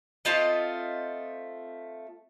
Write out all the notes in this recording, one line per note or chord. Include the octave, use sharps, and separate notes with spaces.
A3 C4 F4 D#5